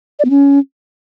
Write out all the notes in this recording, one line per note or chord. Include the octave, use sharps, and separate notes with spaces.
D5
B3
C#4